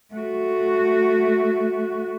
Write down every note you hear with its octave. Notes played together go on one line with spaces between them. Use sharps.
A3 F#4